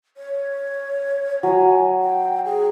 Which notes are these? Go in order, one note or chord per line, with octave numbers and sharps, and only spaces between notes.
C#5
F#3 G#5
G5
G#4